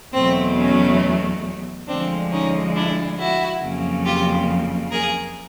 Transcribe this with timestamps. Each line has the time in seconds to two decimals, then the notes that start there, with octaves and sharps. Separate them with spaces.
0.13 E2 B2 F#3 A3 C4
0.57 C#4
1.88 D2 D3 F3 G#3 C4 D4
2.31 C#4 D#4
2.75 D4 E4
3.18 E4 F#4
3.62 F2 C#3 F#3 A#3
4.05 F4 G4
4.92 G#4 A#4